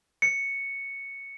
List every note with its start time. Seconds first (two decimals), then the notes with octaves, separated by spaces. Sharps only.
0.22 C#7